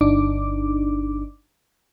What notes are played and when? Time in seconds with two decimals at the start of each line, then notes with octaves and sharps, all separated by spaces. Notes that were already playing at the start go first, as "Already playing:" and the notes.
0.01 G1 D4 D#4 D6